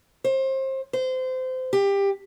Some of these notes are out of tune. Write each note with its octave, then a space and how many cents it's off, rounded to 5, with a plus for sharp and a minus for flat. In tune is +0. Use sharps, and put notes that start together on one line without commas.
C5 +30
C5 -25
G4 +20